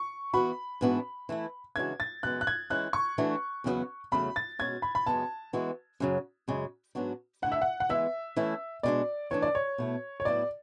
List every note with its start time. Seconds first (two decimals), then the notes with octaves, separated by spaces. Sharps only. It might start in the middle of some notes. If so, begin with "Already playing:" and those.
Already playing: C#6
0.34 E3 B3 F#4 B5
0.81 G#2 E3 B3 D4 F#4
1.29 E3 A3 E4
1.76 C#3 E3 G#3 D4 F#4 G#6
2.00 A6
2.23 F#2 C#3 G#3 B3 F#6
2.41 F#6
2.47 G#6
2.70 E3 G#3 C#4 E4 F#6
2.93 C#6
3.18 E3 A3 D4 F#4
3.64 E2 C#3 F#3 B3 F#4
4.12 E2 C#3 F#3 A3 C#4 B5
4.36 A6
4.59 B2 G#3 C#4 F#4 G#6
4.82 B5
4.95 B5
5.06 F#2 C#3 G#3 B3 A5
5.53 E3 G#3 B3 F#4
6.00 F#2 C#3 F#3
6.48 F#2 C#3 G#3
6.95 G#2 F#3 B3 D4 F#4
7.42 D3 A3 E4 F#5
7.52 E5
7.62 F#5
7.80 F#5
7.89 E3 G#3 B3 E5
8.36 E3 A3 C#4 E4
8.83 B2 G#3 B3 D4 D5
9.31 E3 A3 D4 C#5
9.42 D5
9.55 C#5
9.78 B2 A3 E4
10.20 C#5
10.25 A2 F#3 B3 E4 D5